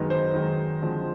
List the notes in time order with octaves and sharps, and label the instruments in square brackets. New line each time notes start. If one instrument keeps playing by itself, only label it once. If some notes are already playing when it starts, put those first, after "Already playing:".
Already playing: [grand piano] F#2 D#3 G#3 B3 D#4
C5
F#2 D#3 G#3 B3 D#4
D3 F3 G#3 C4